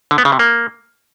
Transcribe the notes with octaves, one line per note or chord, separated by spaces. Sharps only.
D3
B3
C#3
C3
A#3